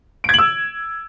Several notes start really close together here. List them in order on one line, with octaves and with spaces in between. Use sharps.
D7 G#6 F#7 E6